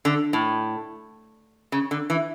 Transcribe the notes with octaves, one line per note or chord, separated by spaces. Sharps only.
D3
A2
C#3
D3
E3